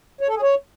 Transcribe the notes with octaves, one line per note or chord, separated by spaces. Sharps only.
C#5
A4
G#4
C#5